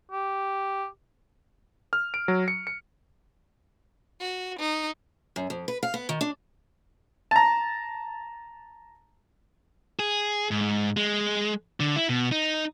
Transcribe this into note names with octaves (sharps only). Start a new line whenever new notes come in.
G4
F6
D7
F#3
C#7
C#7
F#4
D#4
F#2
F2
B4
F5
B3
D#3
D4
A5 A#5
G#4
G#2
G#3
D3
E4
B2
D#4